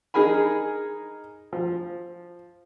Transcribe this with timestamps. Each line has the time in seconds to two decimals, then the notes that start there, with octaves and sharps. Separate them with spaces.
0.14 D#4 G#4 A#4 G#5 B5
1.53 F3